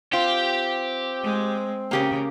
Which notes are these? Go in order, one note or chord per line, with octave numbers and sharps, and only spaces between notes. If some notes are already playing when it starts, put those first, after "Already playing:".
C4 F4 G4
G#3
C#3 A#3 G4 A#4